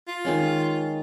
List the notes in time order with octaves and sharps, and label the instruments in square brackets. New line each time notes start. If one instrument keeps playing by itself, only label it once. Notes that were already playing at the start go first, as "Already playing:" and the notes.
[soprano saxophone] F4
[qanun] D#3 G#3 C#4